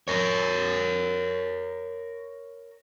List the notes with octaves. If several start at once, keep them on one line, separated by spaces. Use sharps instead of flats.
A#4 C#5